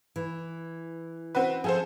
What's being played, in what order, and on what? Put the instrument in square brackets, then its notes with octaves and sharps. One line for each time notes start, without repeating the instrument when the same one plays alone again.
[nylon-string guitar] E3
[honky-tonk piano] C4 F#4 B4
[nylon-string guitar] F3 [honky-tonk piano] G#4 A4 C5